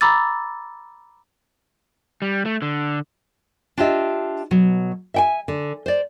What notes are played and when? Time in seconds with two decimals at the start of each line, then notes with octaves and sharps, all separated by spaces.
0.01 A#5 B5 D6 E6 A6
2.22 G3
2.45 A3
2.62 D3
3.77 D4 F4 G4 D#5 E5
4.51 B2 F#3
5.14 E5 G5 G#5
5.48 D3
5.86 C5 D5